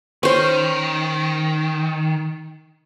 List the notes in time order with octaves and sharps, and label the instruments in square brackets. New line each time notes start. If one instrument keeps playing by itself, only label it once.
[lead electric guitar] D#3 [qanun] C#4 C5